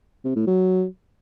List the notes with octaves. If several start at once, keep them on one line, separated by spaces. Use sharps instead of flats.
C3
A2
F#3